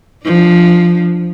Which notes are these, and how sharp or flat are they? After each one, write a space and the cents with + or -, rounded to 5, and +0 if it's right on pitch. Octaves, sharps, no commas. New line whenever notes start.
F3 +0 D4 +20